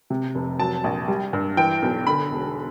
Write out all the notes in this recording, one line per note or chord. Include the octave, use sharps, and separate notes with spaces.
C3
F1
F#3 A5
A#1
G3
G2
E3 G5
B1
D3 B5
E1